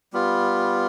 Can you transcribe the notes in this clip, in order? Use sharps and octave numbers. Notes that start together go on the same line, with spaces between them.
G3 B3 F4